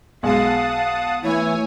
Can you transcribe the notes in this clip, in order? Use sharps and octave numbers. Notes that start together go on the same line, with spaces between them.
B1 G#3 F5 F#5 A5 D#6
E3 A3 E4 C#5 G#5